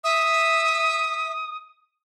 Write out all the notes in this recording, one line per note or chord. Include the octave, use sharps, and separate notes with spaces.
E5 D#6